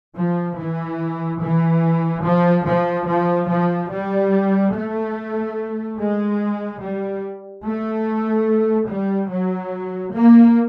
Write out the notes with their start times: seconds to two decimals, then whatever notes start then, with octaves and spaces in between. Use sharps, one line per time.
0.16 F3
0.58 E3
1.41 E3
2.23 F3
2.66 F3
3.08 F3
3.49 F3
3.91 G3
4.74 A3
5.99 G#3
6.81 G3
7.65 A3
8.89 G3
9.31 F#3
10.15 A#3